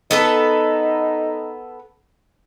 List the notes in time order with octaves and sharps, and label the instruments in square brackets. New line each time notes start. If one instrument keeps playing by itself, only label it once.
[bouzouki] B3 A4 B4 [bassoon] D#4